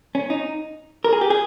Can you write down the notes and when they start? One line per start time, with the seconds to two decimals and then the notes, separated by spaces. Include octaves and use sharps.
0.15 C#4
0.30 D#4
1.04 A#4
1.13 G#4
1.21 G4
1.30 G#4